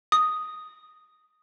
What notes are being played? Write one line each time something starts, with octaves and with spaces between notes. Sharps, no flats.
D#6